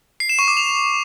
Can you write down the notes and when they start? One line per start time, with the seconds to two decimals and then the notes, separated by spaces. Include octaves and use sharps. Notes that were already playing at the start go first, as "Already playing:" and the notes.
0.20 C7
0.29 E7
0.39 C#6
0.48 D6
0.57 F7